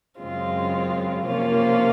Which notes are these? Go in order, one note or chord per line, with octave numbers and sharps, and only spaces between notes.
F#2 C#3 G#3 C4 F4
C3 F3 A#3 C#4 F4